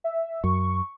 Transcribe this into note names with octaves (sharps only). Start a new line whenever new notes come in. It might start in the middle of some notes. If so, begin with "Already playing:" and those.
E5
F#2 C#6